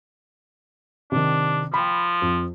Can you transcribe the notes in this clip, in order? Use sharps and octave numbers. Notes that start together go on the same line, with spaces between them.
C3 D#3 D4
F3 G5 B5
F2